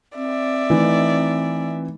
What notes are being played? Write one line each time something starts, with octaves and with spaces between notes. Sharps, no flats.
C4 D5 E5
E3 A3 D#4